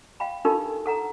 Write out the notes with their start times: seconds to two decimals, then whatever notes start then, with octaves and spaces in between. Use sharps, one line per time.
0.20 F5 G5 B5
0.45 D4 D#4 F4 G4 A4 A#4
0.86 A4 F#5 A#5